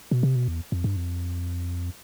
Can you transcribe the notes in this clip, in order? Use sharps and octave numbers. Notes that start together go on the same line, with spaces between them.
B2
C3
B2
E2
F2
G2
F2